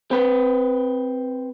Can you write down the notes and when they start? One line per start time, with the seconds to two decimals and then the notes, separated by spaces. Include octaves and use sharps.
0.11 C4 B4